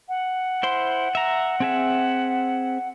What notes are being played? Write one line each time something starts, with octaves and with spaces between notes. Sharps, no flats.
F#5
E4 C5 C6
E5 A#5
C4 G#4 E5